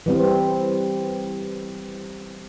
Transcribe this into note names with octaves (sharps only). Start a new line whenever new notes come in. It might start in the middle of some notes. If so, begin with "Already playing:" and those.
E3 G3 C4